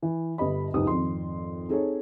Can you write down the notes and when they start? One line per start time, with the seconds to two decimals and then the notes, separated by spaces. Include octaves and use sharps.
0.02 E3
0.38 G1 G4 D#5 B5
0.74 F#1 C#2 G#2 G4 D#6
0.87 G#1 F2 C6
1.69 C4 D#4 G#4 A4 C#5